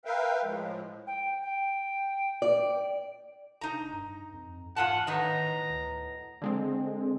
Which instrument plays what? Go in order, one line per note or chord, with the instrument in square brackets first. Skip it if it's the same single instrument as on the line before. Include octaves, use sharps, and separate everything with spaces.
[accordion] A#4 B4 E5 F5 G5
A2 F3 G#3
[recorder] G5
G5
[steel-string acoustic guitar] D5
[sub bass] F1 [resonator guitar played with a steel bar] D#4 A#5
[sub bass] G2
F2
[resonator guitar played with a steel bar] E2 F4 A5 [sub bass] G#2 [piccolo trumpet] F#5
[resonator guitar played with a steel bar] A2 B3 D#4 [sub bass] D#3 [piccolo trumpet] A#5
[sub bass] D2
[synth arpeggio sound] D3 G#3 C4